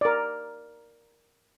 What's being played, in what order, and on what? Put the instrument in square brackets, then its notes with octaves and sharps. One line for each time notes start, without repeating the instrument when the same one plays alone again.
[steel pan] A#4 D5